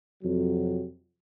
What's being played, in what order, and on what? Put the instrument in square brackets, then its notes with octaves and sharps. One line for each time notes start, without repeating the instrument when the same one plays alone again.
[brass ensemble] F2 C3 F#3